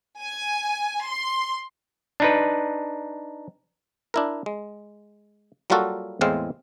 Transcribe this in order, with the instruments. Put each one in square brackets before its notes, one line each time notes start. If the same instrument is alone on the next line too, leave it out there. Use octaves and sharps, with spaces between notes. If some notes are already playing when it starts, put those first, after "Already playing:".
[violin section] G#5
C6
[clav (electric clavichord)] D4 D#4 B4
D4 E4 A#4
G#3
F#3 G3 A#3 F4 F#4 A4
E2 A2 G#3 C4 F5